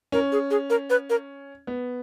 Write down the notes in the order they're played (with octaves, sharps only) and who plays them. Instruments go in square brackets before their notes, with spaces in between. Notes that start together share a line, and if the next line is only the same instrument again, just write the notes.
[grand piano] C#4 [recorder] A#4
[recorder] G#4
G#4
A#4
B4
A#4
[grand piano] B3